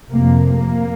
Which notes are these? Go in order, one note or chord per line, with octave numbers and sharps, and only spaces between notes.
F2 C3 A#3
A#3